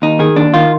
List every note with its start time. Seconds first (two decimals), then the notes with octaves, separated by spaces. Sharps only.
0.02 D#2 D#4
0.19 D#3 G#4
0.36 D#2 D4
0.54 D#3 F4